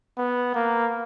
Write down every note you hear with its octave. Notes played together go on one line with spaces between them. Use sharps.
B3
A#3